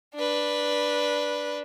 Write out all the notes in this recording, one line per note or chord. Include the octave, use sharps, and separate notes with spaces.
D4 B4